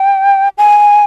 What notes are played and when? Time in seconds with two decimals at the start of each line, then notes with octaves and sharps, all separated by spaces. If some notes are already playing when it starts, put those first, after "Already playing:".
Already playing: G5
0.58 G#5